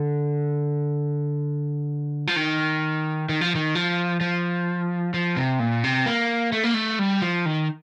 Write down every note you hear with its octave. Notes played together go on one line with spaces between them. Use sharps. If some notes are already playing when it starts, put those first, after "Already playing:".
Already playing: D3
F3
D#3
D#3
F3
D#3
F3
F3
F3
C3
A#2
C3
A#3
A3
A#3
A3
G3
F3
D#3